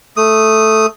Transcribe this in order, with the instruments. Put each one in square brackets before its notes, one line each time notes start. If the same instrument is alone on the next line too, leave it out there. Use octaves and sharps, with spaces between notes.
[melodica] A3 D#6